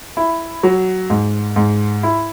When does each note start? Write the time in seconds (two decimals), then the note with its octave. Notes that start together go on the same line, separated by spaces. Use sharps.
0.17 E4
0.63 F#3
1.10 G#2
1.56 G#2
2.03 E4